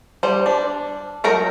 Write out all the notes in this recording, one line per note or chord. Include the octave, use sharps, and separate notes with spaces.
G3 C5
D4
F#3 A#4 G5 A#5